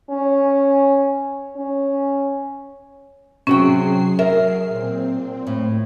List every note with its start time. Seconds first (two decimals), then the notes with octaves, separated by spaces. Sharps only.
0.10 C#4
1.56 C#4
3.47 C3 F#3 C#4 F#4 G#4 G5 C7
4.19 A#4 E5
4.69 A#2 C4
5.47 A2